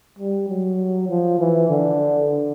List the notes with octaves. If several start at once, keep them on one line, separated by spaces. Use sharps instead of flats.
G3
F#3
F3
E3
D3